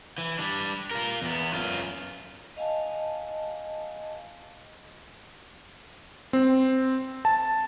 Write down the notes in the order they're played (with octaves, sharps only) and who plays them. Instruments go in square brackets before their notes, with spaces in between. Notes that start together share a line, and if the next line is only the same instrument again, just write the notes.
[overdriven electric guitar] E3
G3 D4
F4 A#4
E2 B3
F#2 F4
[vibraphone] D#5 F5 G#5 A5
[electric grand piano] C4
A5